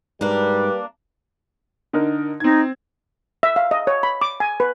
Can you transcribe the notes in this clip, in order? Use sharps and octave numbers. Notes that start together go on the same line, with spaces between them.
G#2 G3 A#3 D4 B4
D3 D#4 A#4
C4 D#4 G#6
E5
F5
D#5
C#5
B5
D6
G#5
B4